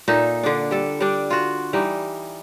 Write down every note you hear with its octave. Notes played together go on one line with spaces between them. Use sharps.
A#2 D#4 A4 E5
D3 D4
G3 A4
G3 D4
F4 F#4
E3 G3 D#4